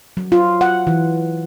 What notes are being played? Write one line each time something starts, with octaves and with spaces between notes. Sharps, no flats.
F#3
F4
F#5
E3